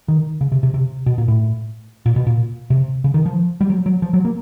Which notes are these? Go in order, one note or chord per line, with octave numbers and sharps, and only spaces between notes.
D#3
C#3
C3
C3
C3
B2
A#2
A2
A#2
B2
A#2
C3
C#3
D#3
F3
G3
F#3
F#3
F3
F#3
A#3